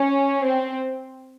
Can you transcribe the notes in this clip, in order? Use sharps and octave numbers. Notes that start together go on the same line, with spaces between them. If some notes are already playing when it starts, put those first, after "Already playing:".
Already playing: C#4
C4